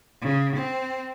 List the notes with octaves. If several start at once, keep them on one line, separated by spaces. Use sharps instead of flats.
C#3
C4